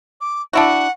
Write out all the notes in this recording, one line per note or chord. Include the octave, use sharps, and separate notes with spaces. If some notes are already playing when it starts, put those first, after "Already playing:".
D6
D4 E4 F#4 F#5